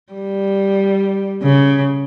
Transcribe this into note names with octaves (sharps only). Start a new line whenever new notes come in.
G3
C#3